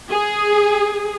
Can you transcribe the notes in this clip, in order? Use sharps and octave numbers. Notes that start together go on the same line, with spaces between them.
G#4